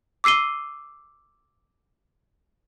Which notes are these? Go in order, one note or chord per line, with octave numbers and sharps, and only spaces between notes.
D6 E6 C7 D#7 G7